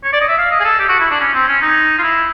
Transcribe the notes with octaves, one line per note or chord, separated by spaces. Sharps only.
C#5
D5
D#5
E5
F5
D#5
G#4
A4
G4
F#4
E4
D4
C#4
C4
C#4
D#4
F4
E4